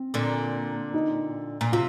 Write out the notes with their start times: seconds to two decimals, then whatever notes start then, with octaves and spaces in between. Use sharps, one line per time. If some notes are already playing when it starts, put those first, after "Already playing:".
Already playing: C4
0.14 A#2 D3
0.94 D#4
1.61 A#2
1.72 C3 F4